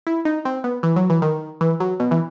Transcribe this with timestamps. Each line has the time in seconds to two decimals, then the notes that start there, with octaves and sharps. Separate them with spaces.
0.07 E4
0.25 D#4
0.45 C4
0.64 B3
0.83 E3
0.96 F#3
1.10 E3
1.22 D#3
1.61 E3
1.80 F#3
2.00 B2
2.11 E3